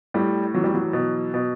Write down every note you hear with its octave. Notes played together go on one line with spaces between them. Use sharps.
A2 G3
E3 F#3
G3
F#3
B2
B2